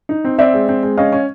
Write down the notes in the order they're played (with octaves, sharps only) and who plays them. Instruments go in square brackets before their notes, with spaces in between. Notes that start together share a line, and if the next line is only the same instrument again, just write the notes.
[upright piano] D#4
C4
[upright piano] C4 [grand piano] D5 E5
[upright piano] G#3
C4
G#3
[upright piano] C#4 [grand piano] D#5 F5
[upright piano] C#4